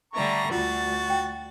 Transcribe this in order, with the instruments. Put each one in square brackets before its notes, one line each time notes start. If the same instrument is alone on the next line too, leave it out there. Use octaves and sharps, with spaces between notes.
[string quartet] D3 G3 A3 [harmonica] A#5 C#6
[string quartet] D2 A6 [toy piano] F4 [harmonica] F#4
[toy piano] G5